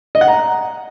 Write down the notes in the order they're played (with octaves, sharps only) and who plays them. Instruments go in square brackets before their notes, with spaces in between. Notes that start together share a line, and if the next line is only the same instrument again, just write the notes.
[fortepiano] D#5
F#5
A#5